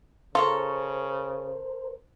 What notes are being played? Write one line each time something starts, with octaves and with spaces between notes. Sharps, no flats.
C#3 F4 A4 A#4 C5 A#5 C#6